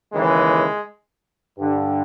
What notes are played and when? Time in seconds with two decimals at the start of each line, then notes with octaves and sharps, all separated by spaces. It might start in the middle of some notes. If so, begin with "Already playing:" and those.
0.12 D#2 C#3 E3 G#3
1.58 G2 D3